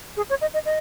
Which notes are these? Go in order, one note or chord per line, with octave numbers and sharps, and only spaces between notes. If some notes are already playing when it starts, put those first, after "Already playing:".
G#4
C#5
D#5
D#5
D#5